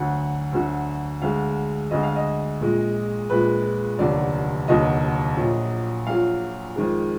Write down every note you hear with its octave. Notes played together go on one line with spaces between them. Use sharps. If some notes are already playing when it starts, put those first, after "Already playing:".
Already playing: D2 D3 F#3 F#5
D2 D3 F#3
D2 D3 G#3 F5
D2 D3 G#3 D#5
F5
D#5
A#1 A#2 G#3
A#1 A#2 G#3 B4
F1 D#2 D3 F#3 D5
F1 D#2 D3 F#3 D#5
A#1 A#2 F#3
A#1 A#2 F#3 F5
F2 D#3 G#3